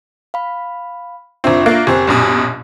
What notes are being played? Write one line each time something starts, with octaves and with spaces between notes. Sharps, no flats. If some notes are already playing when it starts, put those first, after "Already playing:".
F5 B5
F#1 C4 D4 F4 E5
A#3 F#6 A6 C7
F#1 C4 G4 G#5
A#1 F#2 B2